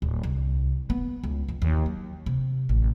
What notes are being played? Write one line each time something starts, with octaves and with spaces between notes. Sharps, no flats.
D1
C2
B3
C#2
F2
D#2
F#3
C3
A1